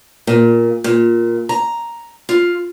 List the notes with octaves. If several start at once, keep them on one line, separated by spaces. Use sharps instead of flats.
A#2
A#2
A#5
F4